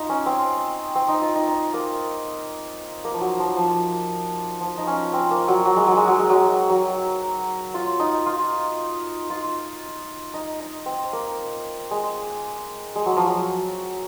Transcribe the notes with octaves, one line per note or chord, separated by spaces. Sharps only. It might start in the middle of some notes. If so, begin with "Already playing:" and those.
Already playing: D#4 F4
C#4
C4
C4
D#4
F4
D#4
D#4
A#3
A#3
F3
F#3
F3
F3
F3
D#4
C#4
C4
A#3
F#3
F#3
G#3
F#3
G#3
F#3
G#3
F#3
F#3
F4
D#4
F4
F4
D#4
D#4
C4
A#3
G#3
G#3
F#3
F3
F#3